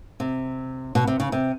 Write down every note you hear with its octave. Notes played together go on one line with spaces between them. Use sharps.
C3
B2
C3
C#3
C3